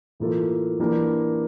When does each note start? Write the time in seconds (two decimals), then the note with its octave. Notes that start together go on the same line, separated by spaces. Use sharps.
0.20 A2 E3 A#3 F4 A4
0.79 E3 A#3 D4 G4 A#4